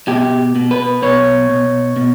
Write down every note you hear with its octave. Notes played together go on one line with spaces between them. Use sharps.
B2 G4
B2
B4
B2 C#5
B2
B2